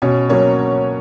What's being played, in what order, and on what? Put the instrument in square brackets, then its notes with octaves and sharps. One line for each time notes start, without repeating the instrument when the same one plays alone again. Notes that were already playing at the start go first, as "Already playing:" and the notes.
[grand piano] B2 [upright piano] C#4 C#5
[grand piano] F#3 A#3 [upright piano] C#4 C#5